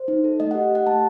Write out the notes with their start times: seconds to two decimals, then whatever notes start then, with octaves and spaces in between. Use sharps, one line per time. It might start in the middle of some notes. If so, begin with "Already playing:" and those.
Already playing: C5
0.08 D#4
0.24 A4
0.40 A3 D#5
0.51 G4 F#5
0.71 G4 F#5
0.87 A3 A5